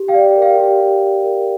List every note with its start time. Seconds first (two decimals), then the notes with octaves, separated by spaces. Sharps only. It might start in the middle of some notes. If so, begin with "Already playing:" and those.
Already playing: G4
0.08 F5 G5
0.14 D5
0.36 A#4
0.42 F5 G5
0.58 G4
0.80 G4
1.02 D5
1.24 A#4